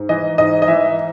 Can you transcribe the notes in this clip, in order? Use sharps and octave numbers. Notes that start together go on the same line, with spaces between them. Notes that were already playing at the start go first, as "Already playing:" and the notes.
Already playing: G#2
E3 D#5
G#2 D#5
D#5
E3 E5